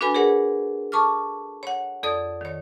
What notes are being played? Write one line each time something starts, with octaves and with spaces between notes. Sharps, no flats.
D4 F#4 A4 B4 G#5 B5
G#4 A#4 C#5 F#5
A4 A5 C#6 D6 F6
C#5 F#5
F2 A4 D5 D#6
D#3 C#5